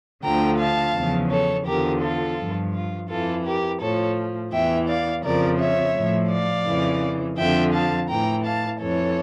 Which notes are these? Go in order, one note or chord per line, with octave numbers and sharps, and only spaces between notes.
D2 D3 F3 G5 A#5
F5 A5
E2 C#3 F3
A4 C#5
E2 D3 F3 G4 A#4
F4 A4
G2 F3
F4
F2 E3 F4 A4
G4 A#4
A2 F3 A4 C#5
E2 E3 E5 G5
D5 F5
F2 C#3 F3 A#4 D5
C#5 E5
A2 F3
D5 F5
F2 C#3 E3
F2 D3 F3 E5 G5
F5 A5
A2 E3 G5 A#5
F5 A5
F2 E3 A4 C#5